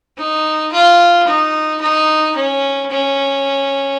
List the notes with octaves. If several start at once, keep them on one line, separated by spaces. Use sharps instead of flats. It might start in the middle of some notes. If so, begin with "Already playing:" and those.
D#4
F4
D#4
D#4
C#4
C#4